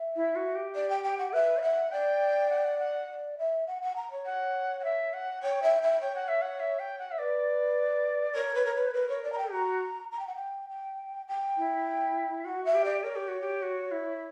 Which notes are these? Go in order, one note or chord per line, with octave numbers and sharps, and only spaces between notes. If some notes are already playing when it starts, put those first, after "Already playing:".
Already playing: E5
E4
F#4
G4
D5
G5
G5
F#5
B4 E5
E5 F#5
D5 G5
F#5
G5
F#5
F#5
D5
E5
F#5
F#5
A#5
C#5
F#5
F#5
E5
F#5
C#5 G5
E5
E5
C#5 G5
F#5
E5
F#5
E5
G5
F#5
E5
B4 D5
A#4 C#5
B4
A#4
B4
A#4 B4
C#5
D5
A#5
G5
F#4 A#5
A#5
G5
F#5
G5
G5
G5
E4
F#4 F#5
E5
G4
D5
A#4 C#5
G4
F#4
G4
F#4
E4